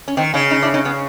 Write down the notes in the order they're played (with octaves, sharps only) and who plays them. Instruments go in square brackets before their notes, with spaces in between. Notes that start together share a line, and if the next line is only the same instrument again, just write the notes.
[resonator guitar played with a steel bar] C#4
[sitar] D#3 [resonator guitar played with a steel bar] C4 D4
[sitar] C#3 [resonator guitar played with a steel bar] C#4 D#4
[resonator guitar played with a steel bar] C#4 D#4
D4 E4
C#4 D#4
B3 C#4